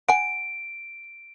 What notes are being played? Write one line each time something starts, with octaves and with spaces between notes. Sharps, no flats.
F#5 G#5 D7